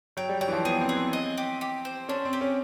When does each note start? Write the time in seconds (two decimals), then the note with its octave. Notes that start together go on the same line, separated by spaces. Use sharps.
0.17 F#3 G5
0.29 G3
0.41 F#3 G5
0.48 E3
0.53 F3
0.65 B3 G#4
0.81 C4
0.89 G#4
0.97 C4
1.13 D#5
1.38 G4
1.61 G4
1.85 C5
2.09 C#4 D4
2.25 C4
2.33 G4
2.41 C#4